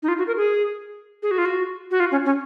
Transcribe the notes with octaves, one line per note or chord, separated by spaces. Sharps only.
D#4
F4
F#4
A#4
G#4
G#4
F#4
F4
F#4
F#4
F4
C#4
C#4